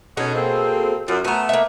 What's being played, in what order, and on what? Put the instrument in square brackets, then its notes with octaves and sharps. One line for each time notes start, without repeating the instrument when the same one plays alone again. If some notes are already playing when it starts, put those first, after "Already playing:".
[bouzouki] B2 G#4 A4 [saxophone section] C#4 D#4 F#4
[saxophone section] A#3 C4
[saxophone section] F#2 [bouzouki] F4
[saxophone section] A3 B3 [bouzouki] G#5 A#5
[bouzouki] A#3 E5